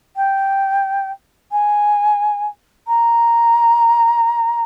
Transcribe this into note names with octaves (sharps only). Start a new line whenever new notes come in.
G5
G#5
A#5